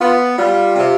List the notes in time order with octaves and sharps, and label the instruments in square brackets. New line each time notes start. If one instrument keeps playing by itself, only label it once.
[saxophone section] B3 [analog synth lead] F4
[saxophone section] G3 [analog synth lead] F4
[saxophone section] C3